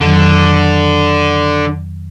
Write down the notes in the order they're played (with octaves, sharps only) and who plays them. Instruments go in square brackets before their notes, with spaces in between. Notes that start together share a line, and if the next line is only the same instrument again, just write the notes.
[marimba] F2 D#3 F#3 [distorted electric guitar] D3